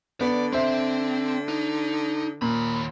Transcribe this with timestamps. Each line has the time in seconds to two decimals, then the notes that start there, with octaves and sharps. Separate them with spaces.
0.21 D3 B3 D5
0.53 C4 C5 E5
1.48 D#4
2.42 D#2 A#2 B5